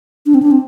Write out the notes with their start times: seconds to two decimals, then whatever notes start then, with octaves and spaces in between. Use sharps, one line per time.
0.26 D4
0.34 C4
0.42 D4
0.51 C4